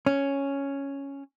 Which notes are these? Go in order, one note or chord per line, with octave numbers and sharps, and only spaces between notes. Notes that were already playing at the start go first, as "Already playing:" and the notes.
C#4